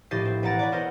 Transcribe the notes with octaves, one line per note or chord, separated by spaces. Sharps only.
A#1 A2 G4 D#5 A6 C7
C4
E1 B4 F#5 A#5 A6 D7
B4 C#5 D5
B3 E4 A#4 C5 D#5 F#5